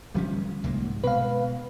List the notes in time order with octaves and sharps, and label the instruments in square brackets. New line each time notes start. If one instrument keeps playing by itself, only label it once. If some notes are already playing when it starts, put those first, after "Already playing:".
[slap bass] D1 F3 C#4 [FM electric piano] G3
[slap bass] C2 G#2 A#3
[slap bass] B2 G#3 [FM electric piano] B4 F5